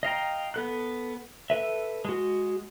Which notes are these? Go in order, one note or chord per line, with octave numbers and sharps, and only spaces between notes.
D#5 F5 G5 A#5
B3 A4 F#6
A4 B4 E5
G#3 F#4